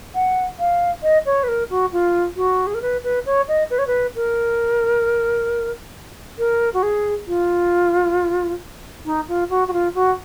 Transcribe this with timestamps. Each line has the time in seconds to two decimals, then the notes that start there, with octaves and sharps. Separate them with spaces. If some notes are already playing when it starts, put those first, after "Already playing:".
0.15 F#5
0.59 F5
1.03 D#5
1.26 C#5
1.43 B4
1.48 A#4
1.70 F#4
1.92 F4
2.36 F#4
2.67 G#4
2.74 A#4
2.82 B4
3.04 B4
3.26 C#5
3.48 D#5
3.70 B4
3.78 C#5
3.87 B4
4.15 A#4
6.38 A#4
6.74 F#4
6.83 G#4
7.27 F4
9.05 D#4
9.28 F4
9.50 F#4
9.68 F#4
9.73 F4
9.95 F#4